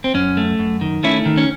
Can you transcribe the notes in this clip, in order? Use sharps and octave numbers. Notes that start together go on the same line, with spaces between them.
C4
F#2 C#4
A3
F#2
D#3
A3 C#4 E4
D#3
C#4